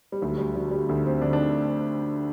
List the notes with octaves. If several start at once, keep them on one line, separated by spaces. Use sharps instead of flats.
G3
D2 F#3
G3
D3 F#3
G3
D2 A3
C4
D3 D4
D4